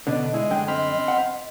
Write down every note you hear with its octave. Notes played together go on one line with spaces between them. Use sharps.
B2 D3 D4 D#5
G#3 E4
F#2 D3 G5
C4 B5 F6
F#5